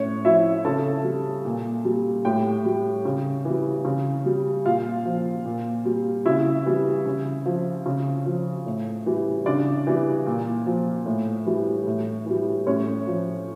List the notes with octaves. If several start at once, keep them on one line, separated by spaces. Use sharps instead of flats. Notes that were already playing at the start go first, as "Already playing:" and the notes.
Already playing: A2 C#4 C#5
F3 E4 E5
C#3 A4 A5
G3
A#2
G3
A2 G4 G5
G3
C#3
E3 G3
C#3
G3
A#2 F4 F5
F3
A#2
G3
C#3 E4 E5
E3 G3
C#3
F3
C#3
F3
A2
E3 G3
C#3 D4 D5
E3 G3
A#2
F3
A2
E3 G3
A2
E3 G3
A2 C#4 C#5
F3